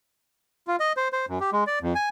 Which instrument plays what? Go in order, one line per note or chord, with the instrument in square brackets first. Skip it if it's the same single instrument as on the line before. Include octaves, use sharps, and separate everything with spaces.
[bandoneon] F4
D#5
C5
C5
F#2
G4
G#3
D5
F2
G#5